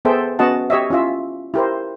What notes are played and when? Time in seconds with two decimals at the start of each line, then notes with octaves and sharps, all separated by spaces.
0.05 B3 G#4 A4 C5 E5 G5
0.39 B3 C#4 F#4 D#5 F#5 A5
0.70 G4 C#5 D#5 E5
0.90 C#4 E4 F4 E5
1.54 E4 G4 A#4 C5